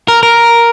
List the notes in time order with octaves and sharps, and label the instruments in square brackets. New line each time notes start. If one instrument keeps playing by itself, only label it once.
[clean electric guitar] A#4
A#4